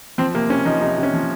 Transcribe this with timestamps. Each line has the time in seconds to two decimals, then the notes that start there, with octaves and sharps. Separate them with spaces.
0.18 F3 C4
0.34 C3 A#3
0.50 C3 C#4
0.65 F3 D#4
0.81 C3 D#4
0.98 C3 C#4
1.14 F3